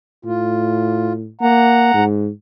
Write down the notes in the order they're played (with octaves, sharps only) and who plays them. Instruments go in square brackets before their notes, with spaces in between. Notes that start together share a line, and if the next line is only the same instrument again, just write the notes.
[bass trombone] A2 [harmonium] F4
[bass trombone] A#3 [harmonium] F#5 A#5
[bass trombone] G#2